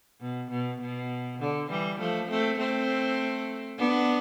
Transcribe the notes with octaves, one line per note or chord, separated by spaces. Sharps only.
B2
B2
B2
D3
E3 G3
F3 A3
A3 C4
A3 C4
B3 D4